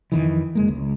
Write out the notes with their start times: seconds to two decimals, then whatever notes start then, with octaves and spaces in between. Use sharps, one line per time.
0.12 F2 D#3 E3
0.55 F#1 G#3 A#3
0.68 C#2